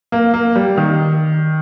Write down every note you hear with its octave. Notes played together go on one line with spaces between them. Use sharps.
A#3
A#3
G3
D#3